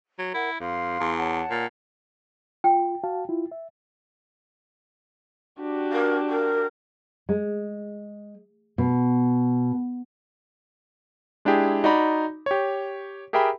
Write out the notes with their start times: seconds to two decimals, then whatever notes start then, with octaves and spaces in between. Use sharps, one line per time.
0.19 F#3
0.34 E4 A#4 F#5
0.60 F2 F5 C6
1.00 E2
1.17 C#5 F#5 A5
1.50 A#2
2.64 F4 G5
3.04 F#4 F5 A5
3.29 E4 F4
3.52 E5
5.60 D4 F#4 G4
5.92 A#4
6.29 A#4
7.29 G#3
8.78 B2
11.45 G#3 D4 E4 G4 G#4
11.84 D#4 F#4 D5 A#5 B5
12.46 G4 C#5
13.33 G4 G#4 A#4 E5 G5 B5